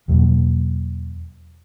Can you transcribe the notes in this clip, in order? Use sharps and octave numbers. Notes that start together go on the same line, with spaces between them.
E2 B2 F#3 A#3